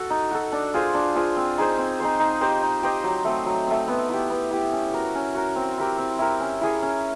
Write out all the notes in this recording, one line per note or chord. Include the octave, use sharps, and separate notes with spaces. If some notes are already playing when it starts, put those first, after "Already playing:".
Already playing: F#4 A4
D#4
F#4 A4
D4
F4 G#4 C5
D4
F4 G#4 C5
C4
D#4 G#4 C5
C4
D#4 G#4 C5
D#4
G4 C5 D#5
D#4
G4 C5 D#5
F#3
A3 C4
F#3
A3 C4
B3
E4 G4
B3
E4 G4
C#4
F#4 A#4
C#4
F#4 A#4
C4
E4 G4 A#4
C4
E4 G4 A#4
C#4
E4 G#4 C#5
C#4